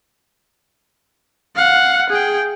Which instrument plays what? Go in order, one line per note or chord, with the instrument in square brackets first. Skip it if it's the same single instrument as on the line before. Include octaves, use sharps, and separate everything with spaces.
[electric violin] F5 F#5
G#4 G5